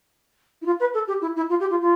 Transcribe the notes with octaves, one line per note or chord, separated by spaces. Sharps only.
E4
F4
B4
A4
G4
E4
E4
F4
G4
F4
F4